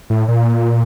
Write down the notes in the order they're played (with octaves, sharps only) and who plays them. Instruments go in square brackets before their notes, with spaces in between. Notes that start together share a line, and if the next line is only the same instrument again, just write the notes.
[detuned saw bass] A2
A#2